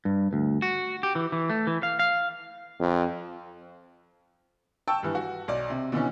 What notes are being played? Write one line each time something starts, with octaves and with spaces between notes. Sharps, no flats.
G2
D2
F#4
G4
E3
E3
A3
E3
F5
F5
F2
G5 A5 C#6 E6
G2 E3
F#4
B1 D5
C3
B2 D3 E3 C#4